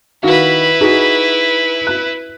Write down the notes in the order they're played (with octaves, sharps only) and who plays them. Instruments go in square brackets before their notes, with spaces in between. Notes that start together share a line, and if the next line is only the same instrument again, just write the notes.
[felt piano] D#3 F#4 F5 [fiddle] E4 B4
[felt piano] D#4 F#4 G#4
F#6